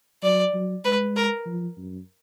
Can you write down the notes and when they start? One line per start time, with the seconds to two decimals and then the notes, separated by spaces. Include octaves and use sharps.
0.23 F#3 D5
0.54 F#3
0.85 G#3 B4
1.16 A#4
1.46 F3
1.77 F#2